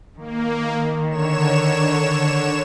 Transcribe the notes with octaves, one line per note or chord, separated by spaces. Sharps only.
D#3 A#3
D3 C#5 E7